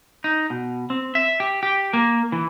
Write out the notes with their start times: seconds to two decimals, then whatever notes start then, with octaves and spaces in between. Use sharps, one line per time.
0.24 D#4
0.50 B2
0.90 C4
1.15 E5
1.40 G4
1.63 G4
1.93 A#3
2.32 E3